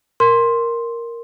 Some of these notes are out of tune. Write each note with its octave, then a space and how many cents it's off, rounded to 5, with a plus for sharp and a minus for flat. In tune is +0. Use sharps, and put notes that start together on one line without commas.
A#4 +0 C6 +5